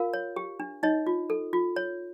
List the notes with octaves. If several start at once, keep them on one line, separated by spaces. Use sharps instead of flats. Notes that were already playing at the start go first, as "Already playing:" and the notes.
Already playing: F4 A#4 F5
C#5
G4
D4
D#4 C#5 D#5
F4
A4
F4
C#5